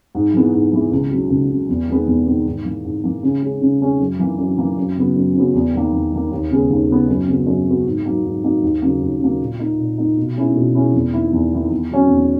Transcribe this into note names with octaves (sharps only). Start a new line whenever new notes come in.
G#2
E3 G#3 B3 E4
G#2
E3 G#3 B3 E4
C#2
C#3 F#3
C#2
C#3 F#3
E2
D#3 G#3 B3
E2
D#3 G#3 B3
G#2
E3 A#3
G#2
E3 A#3
C#3
G#3 C#4
C#3
G#3 C#4
F#2
E3 A#3
F#2
E3 A#3
F#2
C#3 F#3 B3
F#2
C#3 F#3 B3
E2
D#3 A#3
E2
D#3 A#3
D#2
C#3 G#3 B3
D#2
C#3 G#3 B3
F#2
C#3 F#3 B3
F#2
C#3 F#3 B3
G#2
F#3 A#3 D#4
G#2
F#3 A#3 D#4
D#2
C#3 F#3 A#3
D#2
C#3 F#3 A#3
A#2
A#3 D#4
A#2
A#3 D#4
B2
G#3 C#4 E4
B2
G#3 C#4 E4
E2
D#3 A#3 E4
E2
D#3 A#3 E4
E2
D#3 F#3 C#4
E2